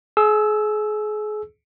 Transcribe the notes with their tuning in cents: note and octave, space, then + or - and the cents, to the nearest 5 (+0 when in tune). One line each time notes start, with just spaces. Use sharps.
G#4 +35 E6 +0